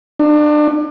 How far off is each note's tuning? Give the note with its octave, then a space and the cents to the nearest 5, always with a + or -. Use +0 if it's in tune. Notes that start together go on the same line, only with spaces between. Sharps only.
D4 +30